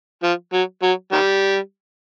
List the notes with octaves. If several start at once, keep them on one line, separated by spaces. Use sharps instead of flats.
F3
F#3
F#3
D#3 G3